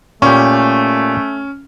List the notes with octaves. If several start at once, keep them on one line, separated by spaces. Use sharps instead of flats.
A#2 A3 C#4 G4 C#6